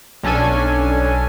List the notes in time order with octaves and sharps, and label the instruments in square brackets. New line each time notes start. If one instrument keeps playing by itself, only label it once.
[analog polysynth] B1 C#4 D4 A4 G#5